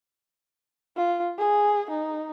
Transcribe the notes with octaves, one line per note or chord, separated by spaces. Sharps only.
F4
G#4
D#4